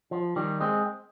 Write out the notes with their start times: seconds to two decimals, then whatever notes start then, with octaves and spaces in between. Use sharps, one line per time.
0.11 F3
0.36 D#3 G3
0.61 G#3 C4